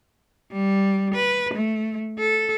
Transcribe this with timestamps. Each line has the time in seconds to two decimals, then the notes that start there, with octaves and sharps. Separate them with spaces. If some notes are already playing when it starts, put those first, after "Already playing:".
0.52 G3
1.15 B4
1.54 A3
2.19 A4